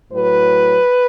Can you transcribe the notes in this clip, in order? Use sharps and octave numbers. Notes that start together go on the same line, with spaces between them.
A2 F#3 B4